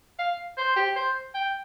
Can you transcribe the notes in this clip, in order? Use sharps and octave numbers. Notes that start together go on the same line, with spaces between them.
F5
C5
G4
C5
G5